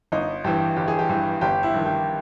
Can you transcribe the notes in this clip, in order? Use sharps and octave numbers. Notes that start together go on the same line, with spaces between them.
G1 D#4
G2 E3 G4
G1 G4
G#4
G4
G2 E3
G1 G4
E4
G2 D#3
G4